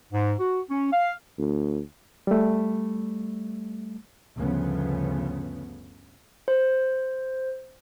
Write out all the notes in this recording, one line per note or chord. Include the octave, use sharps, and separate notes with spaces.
G#2
F#4
C#4
F5
D2
G3 A3
D2 G2 C#3 F3 B3
C5